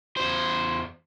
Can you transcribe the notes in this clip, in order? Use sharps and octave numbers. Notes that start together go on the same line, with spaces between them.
E2 C5